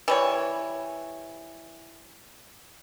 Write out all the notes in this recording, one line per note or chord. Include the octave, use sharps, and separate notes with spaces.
E3 G3 C#5